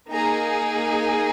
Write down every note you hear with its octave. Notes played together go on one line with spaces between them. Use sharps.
A#3 D#4 G#4 A#5